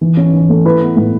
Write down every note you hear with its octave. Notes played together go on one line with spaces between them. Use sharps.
E3
C#4
E3
A3
E4 B4
B3
A2